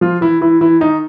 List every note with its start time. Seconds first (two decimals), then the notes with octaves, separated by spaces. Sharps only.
0.01 F3 F4
0.21 E3 E4
0.41 E3 E4
0.61 E3 E4
0.81 D#3 D#4